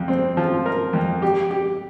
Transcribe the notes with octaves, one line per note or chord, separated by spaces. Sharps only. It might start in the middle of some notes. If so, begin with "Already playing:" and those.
Already playing: F2
C4
F3
A#4
F2
G4
G4